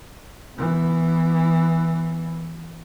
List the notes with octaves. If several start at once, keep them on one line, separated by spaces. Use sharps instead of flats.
E3 B3